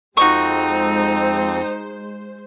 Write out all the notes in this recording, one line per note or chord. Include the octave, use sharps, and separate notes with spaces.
F2 G#3 C4 D#4 F#4 C5 C#6